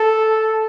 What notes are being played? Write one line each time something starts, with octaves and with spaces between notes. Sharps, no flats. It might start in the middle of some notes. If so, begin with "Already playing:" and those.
Already playing: A4